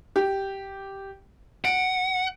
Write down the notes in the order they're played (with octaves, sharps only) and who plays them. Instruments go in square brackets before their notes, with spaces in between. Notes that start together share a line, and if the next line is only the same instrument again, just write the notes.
[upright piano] G4
[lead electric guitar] F#5 [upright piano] D7